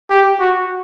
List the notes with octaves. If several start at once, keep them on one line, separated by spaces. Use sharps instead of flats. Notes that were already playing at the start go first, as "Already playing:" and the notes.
G4
F#4